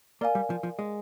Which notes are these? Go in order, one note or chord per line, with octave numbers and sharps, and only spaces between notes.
A#3 A#4 D5 F5 G#5
G3
F3
F3
G#3